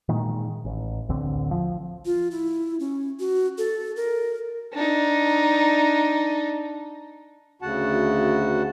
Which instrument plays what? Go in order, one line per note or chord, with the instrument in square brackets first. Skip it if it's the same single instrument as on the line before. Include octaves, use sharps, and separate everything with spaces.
[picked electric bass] A#2 D#3 G#3
A1
A1 D2 D3 C4
F3
[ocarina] F4
E4
C#4
F#4
A4
A#4
[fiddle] D4 D#4
[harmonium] D2 C#3 F#4 F#5 A5